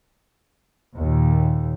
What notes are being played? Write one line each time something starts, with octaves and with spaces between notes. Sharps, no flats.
D#2 A#2